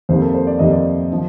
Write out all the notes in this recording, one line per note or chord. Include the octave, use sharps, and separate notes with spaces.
F2 C3 D#3 A#3 C5
A4
C5
D5
F2 C3 D#3 A#3 D#5
D5
D3 F3